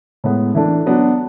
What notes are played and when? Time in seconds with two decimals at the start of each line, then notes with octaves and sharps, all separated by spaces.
0.24 A2 G#3 B3
0.55 E3 A3 D4
0.86 F#3 B3 D4